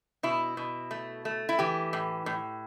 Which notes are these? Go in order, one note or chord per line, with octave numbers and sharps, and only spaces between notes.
B2 E4
B2
A3
A3
E4
E3 G4
A2
A2